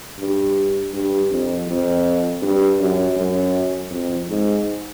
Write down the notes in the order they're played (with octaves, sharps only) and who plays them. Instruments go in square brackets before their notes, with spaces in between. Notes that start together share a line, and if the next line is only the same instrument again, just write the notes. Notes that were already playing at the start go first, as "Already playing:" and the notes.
[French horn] G2
G2
F2
F2
G2
F#2
F#2
F2
G#2